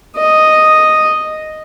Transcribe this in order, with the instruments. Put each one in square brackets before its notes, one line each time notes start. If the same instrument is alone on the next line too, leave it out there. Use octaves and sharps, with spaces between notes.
[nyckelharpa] D#5